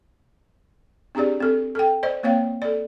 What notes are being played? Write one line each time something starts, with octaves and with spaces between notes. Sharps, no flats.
C4 D4 G4 G#4 D5
C4 A4
A4 G5
C5 D5 D#5
A#3 C4 C#5 F5 G5
A4 D5